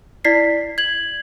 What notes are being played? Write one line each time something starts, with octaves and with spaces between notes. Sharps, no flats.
E4 D5 B6 C7
G#6 F#7